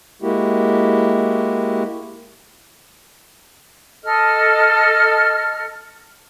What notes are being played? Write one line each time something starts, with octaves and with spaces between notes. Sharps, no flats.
G#3 A#3 E4 F#4 G4
A4 D#5 F6